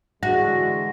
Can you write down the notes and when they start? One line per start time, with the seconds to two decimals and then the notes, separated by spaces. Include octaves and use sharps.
0.23 D3 E3 G#3 F#4 A#6